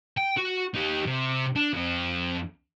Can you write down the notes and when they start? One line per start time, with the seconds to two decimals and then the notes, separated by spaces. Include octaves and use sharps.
0.17 G5
0.37 F#4
0.75 D#4 G4
1.06 C3
1.56 D4
1.73 F2 C4